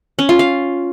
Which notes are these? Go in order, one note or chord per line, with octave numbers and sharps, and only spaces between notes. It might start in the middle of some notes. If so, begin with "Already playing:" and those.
C#4
F4
F5